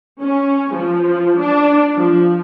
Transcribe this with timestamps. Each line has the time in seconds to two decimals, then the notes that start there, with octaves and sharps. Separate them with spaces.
0.22 C#4
0.73 F3
1.40 D4
1.96 F3